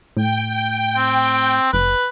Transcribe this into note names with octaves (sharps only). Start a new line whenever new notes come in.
A2 G5
C4
F#1 B4